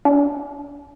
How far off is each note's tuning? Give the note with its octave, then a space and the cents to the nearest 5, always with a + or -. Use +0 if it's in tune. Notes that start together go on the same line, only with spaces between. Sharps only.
D4 -40